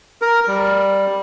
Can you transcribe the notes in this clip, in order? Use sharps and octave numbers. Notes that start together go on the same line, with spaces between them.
A#4
G3